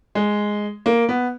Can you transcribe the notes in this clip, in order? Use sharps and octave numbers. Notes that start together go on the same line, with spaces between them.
G#3
A#3
B3